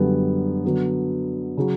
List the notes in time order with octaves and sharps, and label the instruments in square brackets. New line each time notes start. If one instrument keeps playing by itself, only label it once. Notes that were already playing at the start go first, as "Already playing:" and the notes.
Already playing: [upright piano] F#2 D3 G3 B3
D3 F#3 B3
C#3 F#3